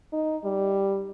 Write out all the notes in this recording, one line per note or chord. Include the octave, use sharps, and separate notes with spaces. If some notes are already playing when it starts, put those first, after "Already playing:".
D#4
G3